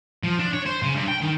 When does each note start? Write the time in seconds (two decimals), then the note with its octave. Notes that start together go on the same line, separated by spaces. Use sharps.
0.24 F3
0.39 D4
0.54 C#5
0.66 C5
0.82 C#3
0.95 G2
1.08 G5
1.21 D#3